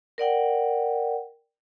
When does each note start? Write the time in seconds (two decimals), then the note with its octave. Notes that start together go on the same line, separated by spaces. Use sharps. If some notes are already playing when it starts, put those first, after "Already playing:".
0.18 A#4 D5 F#5 G5